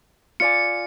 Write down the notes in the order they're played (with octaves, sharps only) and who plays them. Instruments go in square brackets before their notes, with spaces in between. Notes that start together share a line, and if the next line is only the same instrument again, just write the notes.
[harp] F4 D5 G#5 [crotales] C#7